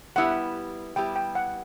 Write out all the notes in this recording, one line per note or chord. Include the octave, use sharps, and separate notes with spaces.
G3 B3 E4 G4 F#5
G3 B3 E4 G4 G5
G5
F#5